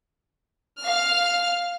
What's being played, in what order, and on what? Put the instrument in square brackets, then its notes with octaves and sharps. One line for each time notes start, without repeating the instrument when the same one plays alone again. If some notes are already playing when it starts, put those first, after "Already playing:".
[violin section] F5 F6